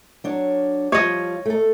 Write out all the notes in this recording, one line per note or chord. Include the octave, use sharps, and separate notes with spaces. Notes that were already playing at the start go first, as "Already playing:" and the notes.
F#3 D4 C#5
F3 G3 F4 C#5 D#5
A3 A4